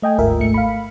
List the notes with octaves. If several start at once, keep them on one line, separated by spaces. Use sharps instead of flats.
A3 D#5 G5 G#5
G1 D2 G#2 F4 A#4 E5
G#1 G#2 A3 C#7
F5 B5